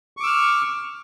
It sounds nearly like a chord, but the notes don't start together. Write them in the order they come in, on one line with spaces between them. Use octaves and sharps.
C#6 D6 E6 F6